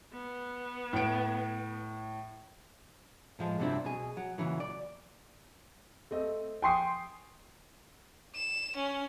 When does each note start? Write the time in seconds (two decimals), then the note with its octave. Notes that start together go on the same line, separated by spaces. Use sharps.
0.13 B3
0.93 A2 D7
3.39 A2 F3 G#3
3.59 G2 C3 F#3 C4 D4 E4
3.85 B2 G#4
4.17 F#3
4.38 A#2 C#3 E3 F#3
4.60 D5
6.11 A3 C4 D#5
6.62 G5 G#5 C6 C#6 D#6 C7
8.35 E7
8.76 C#4